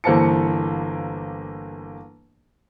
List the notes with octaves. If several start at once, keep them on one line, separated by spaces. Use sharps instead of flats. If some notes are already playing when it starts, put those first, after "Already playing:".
G1 E3 A#3 C5 A5 C#7